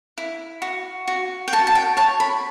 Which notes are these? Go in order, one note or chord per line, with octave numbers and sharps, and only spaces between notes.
E4
F#4
F#4
G5
F#4 A5
A5
G5
C#5 A5
B5